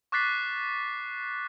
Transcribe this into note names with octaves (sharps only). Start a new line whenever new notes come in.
C#6 D6 F#6 A6 B6 C7